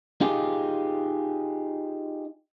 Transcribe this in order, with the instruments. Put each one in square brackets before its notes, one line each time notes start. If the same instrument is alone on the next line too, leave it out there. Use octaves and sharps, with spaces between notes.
[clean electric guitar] D#4 F4 G4 G#4